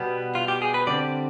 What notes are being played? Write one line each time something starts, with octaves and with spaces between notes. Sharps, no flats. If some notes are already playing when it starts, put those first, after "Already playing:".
Already playing: B2 G3 B3
F4
G4
G#4
B4
D3 G3 C4 D5